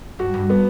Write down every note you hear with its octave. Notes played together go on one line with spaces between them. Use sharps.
G2 F#4
G2
B3